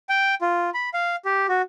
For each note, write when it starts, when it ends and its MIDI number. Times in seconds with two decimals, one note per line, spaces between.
0.09 0.35 79
0.41 0.70 65
0.74 0.89 83
0.94 1.16 77
1.25 1.47 67
1.48 1.62 66